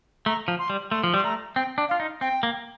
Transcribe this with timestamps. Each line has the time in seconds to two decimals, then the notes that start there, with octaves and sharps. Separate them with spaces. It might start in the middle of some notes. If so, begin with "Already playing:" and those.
0.26 A3 A#5
0.48 F3
0.59 C6
0.70 G3
0.91 A3 C6
1.04 F3
1.14 G3 C6
1.24 A3 A#5
1.56 C4 G5
1.78 D4
1.89 F4 F5
2.00 D#4
2.21 C4 G5
2.43 A#3